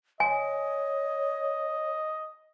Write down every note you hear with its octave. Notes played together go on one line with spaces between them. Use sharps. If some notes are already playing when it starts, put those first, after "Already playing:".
C#5 D#5 G#5